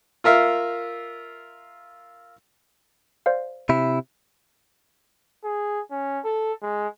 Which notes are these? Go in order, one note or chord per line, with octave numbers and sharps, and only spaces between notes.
F4 A#4 E5 F5
C5 D5 F5
C3 E4
G#4
C#4
A4
G#3